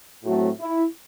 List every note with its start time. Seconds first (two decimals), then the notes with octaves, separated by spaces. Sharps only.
0.24 A2 F#3 A3 C4 F#4
0.60 E4